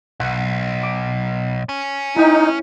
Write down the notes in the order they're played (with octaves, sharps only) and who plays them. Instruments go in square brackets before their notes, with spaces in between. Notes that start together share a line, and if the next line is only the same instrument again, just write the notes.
[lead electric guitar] B1 [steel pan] F#5
[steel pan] D6
[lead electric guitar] C#4
[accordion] D#4 [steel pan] E4 G5